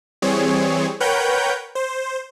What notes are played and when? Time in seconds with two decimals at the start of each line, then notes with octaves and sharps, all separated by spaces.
0.22 E3 G3 C4 G#4 C#5
1.00 A#4 B4 C#5 F#5 G5 G6
1.75 C5